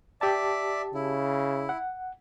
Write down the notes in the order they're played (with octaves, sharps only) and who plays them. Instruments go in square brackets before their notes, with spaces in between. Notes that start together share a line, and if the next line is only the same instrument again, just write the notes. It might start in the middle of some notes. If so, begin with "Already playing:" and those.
[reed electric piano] G4 A5 [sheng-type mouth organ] D5 E5
[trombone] C#3 [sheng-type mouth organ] E4
[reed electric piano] F#5